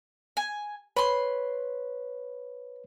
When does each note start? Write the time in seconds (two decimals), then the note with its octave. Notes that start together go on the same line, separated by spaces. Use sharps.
0.37 G#5
0.97 B4 C#5 B5 C6